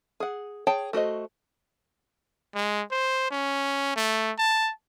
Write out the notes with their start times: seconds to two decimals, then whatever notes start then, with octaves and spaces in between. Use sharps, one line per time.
0.20 G#4 F#5
0.67 G#4 C#5 G5 A5
0.93 A3 F#4 C5 D#5
2.55 G#3
2.91 C5
3.31 C#4
3.96 A3
4.38 A5